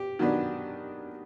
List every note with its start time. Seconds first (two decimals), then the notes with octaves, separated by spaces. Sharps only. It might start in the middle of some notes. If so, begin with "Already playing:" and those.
Already playing: G4
0.19 D#3 F#3 B3 D4